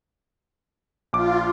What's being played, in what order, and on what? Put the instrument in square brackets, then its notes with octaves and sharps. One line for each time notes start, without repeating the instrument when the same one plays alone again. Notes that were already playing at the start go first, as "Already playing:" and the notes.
[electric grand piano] A#1 D6 [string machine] F4